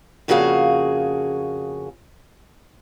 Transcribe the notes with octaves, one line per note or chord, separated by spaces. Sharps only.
F2 C#3 A#3 F#4 G#4 F5